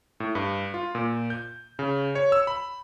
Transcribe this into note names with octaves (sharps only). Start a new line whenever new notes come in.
A2
G2
F4
A#2
G6
C#3
C#5
E6
B5